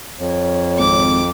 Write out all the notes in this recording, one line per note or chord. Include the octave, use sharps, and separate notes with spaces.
F2 C#5
G#1 D6